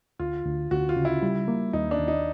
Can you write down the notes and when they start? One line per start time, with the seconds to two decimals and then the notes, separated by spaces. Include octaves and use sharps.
0.19 D2 F4
0.45 D2
0.71 D2 F#4
0.89 F4
0.96 C#3
1.05 E4
1.22 G3
1.48 A#3
1.73 D#2 D#4
1.91 D4
2.00 D#2
2.08 D#4